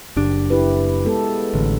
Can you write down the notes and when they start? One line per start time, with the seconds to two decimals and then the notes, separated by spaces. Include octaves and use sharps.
0.17 F#1 D4 G4
0.50 E4 G4 B4
1.05 G#3 B3 A4
1.54 A1 D3